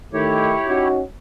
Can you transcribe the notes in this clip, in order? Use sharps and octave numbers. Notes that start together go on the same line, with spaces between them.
D#3 A3 E4 G4 C#5
C#4 D#4 F#4